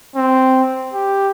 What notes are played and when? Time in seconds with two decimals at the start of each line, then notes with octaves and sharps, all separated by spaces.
0.16 C4
0.93 G4